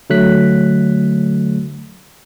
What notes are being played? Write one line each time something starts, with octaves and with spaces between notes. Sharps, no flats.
D3 F#3 A3 F#6 B6